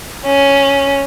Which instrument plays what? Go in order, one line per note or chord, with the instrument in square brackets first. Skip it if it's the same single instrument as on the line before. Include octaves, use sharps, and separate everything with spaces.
[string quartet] C#4